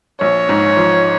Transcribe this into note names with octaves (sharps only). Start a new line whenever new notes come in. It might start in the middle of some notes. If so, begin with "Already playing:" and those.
A#1 C#5
G#2
F3